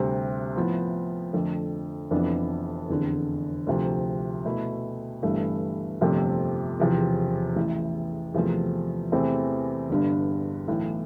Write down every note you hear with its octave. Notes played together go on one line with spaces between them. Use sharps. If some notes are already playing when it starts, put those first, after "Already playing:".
Already playing: D2 C3 G3 C4
A2 F3 B3
F2 D3 A3
F1 F2 E3 B3 D4
F1 E2 D3
D2 C3 F3
B2 A3 E4
G1 G2 E3 A3
G1 F2 C3 F3 A3
E1 E2 C3 F3
A1 A2 E3
E2 C3 F3 A3
E2 C3 E3 A3 C4
G1 G2 D3
B1 A2 E3 A3